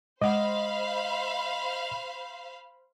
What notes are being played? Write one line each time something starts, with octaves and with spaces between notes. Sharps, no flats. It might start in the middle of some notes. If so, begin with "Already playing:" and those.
G#3 C5 D#5 F5 F#5 B5